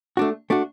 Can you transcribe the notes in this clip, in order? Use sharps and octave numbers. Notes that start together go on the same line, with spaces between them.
A3 D4 F#4
A3 D4 F#4